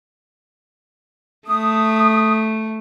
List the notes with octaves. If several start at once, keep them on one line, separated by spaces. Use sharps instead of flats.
A3 D#6